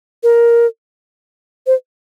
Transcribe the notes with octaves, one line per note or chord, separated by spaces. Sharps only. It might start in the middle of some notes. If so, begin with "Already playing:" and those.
A#4
C5